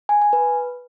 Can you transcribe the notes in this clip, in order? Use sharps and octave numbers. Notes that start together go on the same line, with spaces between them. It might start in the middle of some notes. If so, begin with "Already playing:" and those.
G#5
G#5
B4